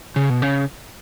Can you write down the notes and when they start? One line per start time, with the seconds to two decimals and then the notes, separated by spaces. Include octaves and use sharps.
0.16 C#3
0.30 B2
0.42 C#3